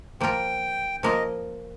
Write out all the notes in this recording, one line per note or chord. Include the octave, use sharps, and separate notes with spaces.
F3 A#3 F4 A#4 G5
F3 A#3 F4 A#4 D#5